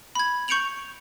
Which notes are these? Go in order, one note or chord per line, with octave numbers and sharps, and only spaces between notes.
B5 G#6
C#6 G6 C#7 D7 F7 F#7